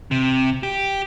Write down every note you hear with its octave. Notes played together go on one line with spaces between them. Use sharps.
C3
G4